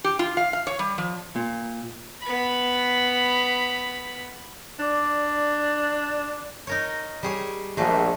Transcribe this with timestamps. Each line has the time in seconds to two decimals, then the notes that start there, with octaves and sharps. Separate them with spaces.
0.04 G4
0.19 F4
0.37 F5
0.53 F5
0.67 C#5
0.79 G3
0.98 F3
1.36 A#2
2.22 B3 B5
4.79 D4 D5 D6
6.67 D#4 A#4 C#5
7.23 G3 G#4 C#5
7.77 A#1 G#3 A3